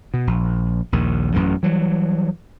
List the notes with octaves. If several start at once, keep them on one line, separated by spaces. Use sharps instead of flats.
B2
A#1
A#1 D#2 D#3
A1 F#2 A2 E3
E3 F#3 G3